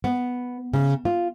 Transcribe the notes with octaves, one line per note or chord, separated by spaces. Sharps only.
B3
C#3
F4